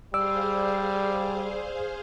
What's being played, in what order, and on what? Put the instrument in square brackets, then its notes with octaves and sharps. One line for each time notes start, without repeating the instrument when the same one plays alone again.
[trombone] G3 [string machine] G#4 C5 F5 [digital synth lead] D5 [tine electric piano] E6